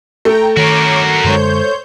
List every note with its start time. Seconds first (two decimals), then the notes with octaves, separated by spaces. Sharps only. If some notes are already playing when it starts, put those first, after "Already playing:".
0.25 A3 G5 A#5
0.57 D#3 F#4 A#4 C#5 D6
1.24 F#2 D3 G#3 C5 C#5 G6